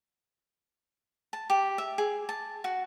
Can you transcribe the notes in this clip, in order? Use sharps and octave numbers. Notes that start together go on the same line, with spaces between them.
A5
G4
E5
G#4
A5
F#4